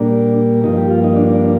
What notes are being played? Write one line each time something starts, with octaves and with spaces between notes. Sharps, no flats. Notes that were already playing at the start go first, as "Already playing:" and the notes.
Already playing: A#2 G3 A#3 D4
G2 F3 A#3 D#4
G4
F4
D#4
D4
D4